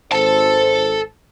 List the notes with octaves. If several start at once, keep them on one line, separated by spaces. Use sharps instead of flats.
G#1 A4 C5 A5